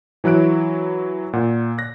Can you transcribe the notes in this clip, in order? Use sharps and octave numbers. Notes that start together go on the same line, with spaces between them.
E3 F#3 E4 F#6 D7
A#2 F#5
F#6 A#6